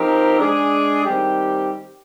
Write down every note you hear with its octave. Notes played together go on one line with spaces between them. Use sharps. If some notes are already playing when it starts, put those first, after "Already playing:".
Already playing: F3 C4 D#4 G4 A#4
G#3 D4 G#4
D#3 G3 C4 G4